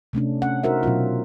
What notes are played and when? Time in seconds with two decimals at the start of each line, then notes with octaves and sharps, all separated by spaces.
0.13 C3 A3 C#4 D4
0.42 C#4 F#5
0.63 D#4 F#4 A#4 C5 E5
0.83 B2 F#3 C#4 F4